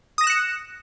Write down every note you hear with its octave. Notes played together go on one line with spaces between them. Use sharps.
D#6 F#6 A#6 C#7 E7